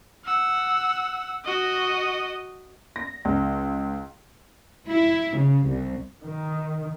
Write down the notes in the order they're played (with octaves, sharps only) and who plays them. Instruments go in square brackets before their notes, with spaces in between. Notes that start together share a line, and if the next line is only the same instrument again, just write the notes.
[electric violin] F#5 E6
F#4 D#5
[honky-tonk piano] A#6
C#2
[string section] E4
C#3
C2
[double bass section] D#3